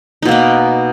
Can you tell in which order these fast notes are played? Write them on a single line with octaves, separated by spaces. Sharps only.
D#4 B2 A#3 B3